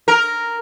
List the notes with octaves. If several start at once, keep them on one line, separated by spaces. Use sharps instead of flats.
A#4